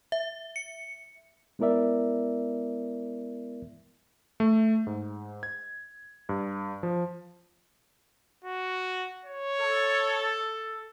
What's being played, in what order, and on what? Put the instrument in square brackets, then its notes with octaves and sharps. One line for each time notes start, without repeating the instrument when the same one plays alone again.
[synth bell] E5
C#7
[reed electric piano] G#3 B3 E4 A#4 D5 E5
[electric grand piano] A3
G#2
G#6
G2
F3
[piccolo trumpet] F#4
C#5
[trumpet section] A4